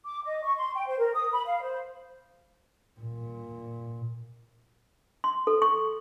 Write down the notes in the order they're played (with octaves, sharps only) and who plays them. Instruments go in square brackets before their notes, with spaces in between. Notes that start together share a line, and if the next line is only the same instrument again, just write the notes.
[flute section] D6
D#5
C#6
C6
G5
C5
A#4
D#6
B5
F5
C5
[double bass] A#2
[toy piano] C6
A4
C#6